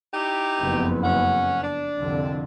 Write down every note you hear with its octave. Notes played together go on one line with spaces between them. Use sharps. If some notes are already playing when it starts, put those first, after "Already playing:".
D#4 E4 G4
F#1 F2 B3
C#4 F#5
D4
C2 F2 D3